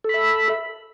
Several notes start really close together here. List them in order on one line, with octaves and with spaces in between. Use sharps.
A4 B5 E5